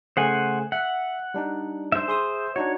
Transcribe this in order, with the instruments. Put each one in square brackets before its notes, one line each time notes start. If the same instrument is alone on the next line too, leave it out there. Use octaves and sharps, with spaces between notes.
[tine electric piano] C#3 A3 G#4 [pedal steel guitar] C5 F#5 G#5
[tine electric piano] E5 [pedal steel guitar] F#5
[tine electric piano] G3 D4 D#4
[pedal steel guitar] C5 E5
[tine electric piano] G#4 C6 D#6
[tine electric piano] D4 D#4 F#4 [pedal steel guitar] C#5